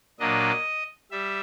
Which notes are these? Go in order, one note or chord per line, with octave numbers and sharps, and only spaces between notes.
A#2 F#3 A#3 D4 D#5
G3 E5